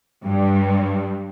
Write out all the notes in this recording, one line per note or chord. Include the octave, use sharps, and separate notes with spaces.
G2